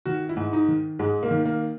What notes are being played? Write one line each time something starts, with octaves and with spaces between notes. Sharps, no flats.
D#3 F#4
E4
G#2
D#4
D#3
G#2 G#3
A#3
D#3
A#3